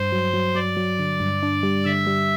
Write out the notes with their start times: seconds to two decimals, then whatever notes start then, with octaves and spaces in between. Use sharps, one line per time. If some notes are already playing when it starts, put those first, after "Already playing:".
Already playing: G2 C5
0.12 F#3
0.34 F#3
0.55 F#3 D5
0.77 F#3
0.99 D3
1.20 G2
1.43 D4
1.63 G3
1.85 D3 E5
2.07 G3